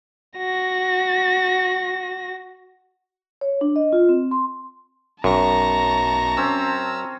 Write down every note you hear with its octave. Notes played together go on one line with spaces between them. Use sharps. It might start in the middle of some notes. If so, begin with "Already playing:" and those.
F#4 A#6
C#5
D4
D#5
F4
C4
C6
B1 F#2 A5 A#5 C#6 A#6
C4 C#4 E6